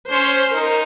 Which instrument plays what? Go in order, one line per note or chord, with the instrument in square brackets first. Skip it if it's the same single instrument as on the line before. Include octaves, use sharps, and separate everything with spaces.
[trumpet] C#4 [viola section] C5
[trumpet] D#4 [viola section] A#4